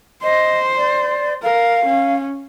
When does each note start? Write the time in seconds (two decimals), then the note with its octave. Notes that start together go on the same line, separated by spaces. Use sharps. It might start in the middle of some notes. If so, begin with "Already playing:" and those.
0.23 C5 D#5
0.77 D5
1.43 A#4 F5
1.86 C#4